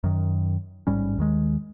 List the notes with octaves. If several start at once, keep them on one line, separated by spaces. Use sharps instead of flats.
F#2 D#3
A1 G#2 G3 C#4
D#2 D#3 G#3